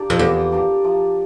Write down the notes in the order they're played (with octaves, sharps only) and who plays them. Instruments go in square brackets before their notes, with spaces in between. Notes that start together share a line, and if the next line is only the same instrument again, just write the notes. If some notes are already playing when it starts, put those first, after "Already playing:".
Already playing: [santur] A#3 D4 G4
[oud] F2
[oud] E2 [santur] F3
[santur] A#3 D4 G4
F3